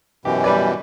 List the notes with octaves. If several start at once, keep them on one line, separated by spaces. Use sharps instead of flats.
F#2 B2 E3 G4
G3 B4 D5